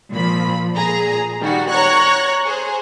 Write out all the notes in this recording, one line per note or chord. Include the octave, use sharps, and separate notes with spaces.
A#2 F3 B5
A#2 G#4 A#5
D#3 G3 F#4
C#5 A#5 C#6 F#6 G#6
G#4 C5